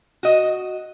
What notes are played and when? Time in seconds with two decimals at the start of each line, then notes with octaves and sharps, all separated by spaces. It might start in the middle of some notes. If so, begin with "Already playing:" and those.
0.23 F#4 D#5